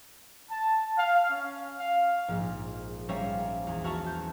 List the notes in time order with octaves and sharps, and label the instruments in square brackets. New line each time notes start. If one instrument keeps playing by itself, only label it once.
[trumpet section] A5
F5
C#4
F5
[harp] A#1 G#2
G3 C#4 A#4 C#5 E5 F5
E2
F#4 A#4 E5 A5 C#6
G6